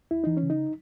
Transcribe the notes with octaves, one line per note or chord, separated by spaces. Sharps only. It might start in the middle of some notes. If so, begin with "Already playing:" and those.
D#2 E4
E3 D#4
C#4
C#3
D#4